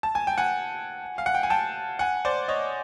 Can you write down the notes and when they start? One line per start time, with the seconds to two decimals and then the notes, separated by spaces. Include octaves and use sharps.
0.03 A5
0.15 G#5
0.27 G5
0.38 F#5 G#5
1.18 F5
1.26 F#5
1.35 G5
1.43 G#5
1.50 G5 A5
1.99 F#5 G#5
2.25 C5 D5
2.48 C#5 D#5